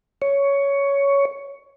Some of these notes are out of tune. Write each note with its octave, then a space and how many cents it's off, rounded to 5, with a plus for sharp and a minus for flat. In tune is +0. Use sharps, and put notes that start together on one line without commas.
C#5 +10